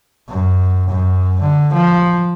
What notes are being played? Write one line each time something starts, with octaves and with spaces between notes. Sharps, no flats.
F#2
F#2
D3
F3